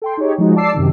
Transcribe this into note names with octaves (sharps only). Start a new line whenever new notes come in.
A4 G5 C6
D#4 G4 G#4 C#5
F3 G#3 D#4 F#4
D5 A5 D6 E6 C7
F#2 C3 D#3